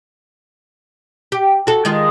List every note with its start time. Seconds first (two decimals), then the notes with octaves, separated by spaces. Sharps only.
1.32 G4
1.67 F#4 A4
1.85 D#3 G#3 F4